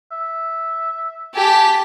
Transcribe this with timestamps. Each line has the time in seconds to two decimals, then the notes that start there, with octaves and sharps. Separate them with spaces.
0.12 E5
1.35 G4 G#5 A5 B6